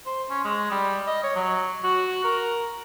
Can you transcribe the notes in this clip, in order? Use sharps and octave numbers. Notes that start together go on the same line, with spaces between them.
C5
C#4
G#3
G3
D#5
C#5
F#3
F#4
A#4